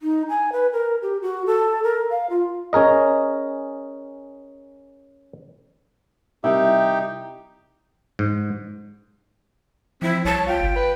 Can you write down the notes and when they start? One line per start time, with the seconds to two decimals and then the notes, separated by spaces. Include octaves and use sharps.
0.02 D#4
0.29 G#5
0.52 B4
0.73 A#4
1.02 G4
1.22 F#4
1.46 A4
1.83 A#4
2.10 F5
2.30 F4
2.73 C#4 G#4 A#4 D#5
6.44 C3 G3 D#4 E4 G4 A#4 E5 G5
8.19 G#2
10.02 F3 C4 E4
10.25 C2 C#5 A5
10.47 F4 G5
10.61 G1
10.76 B4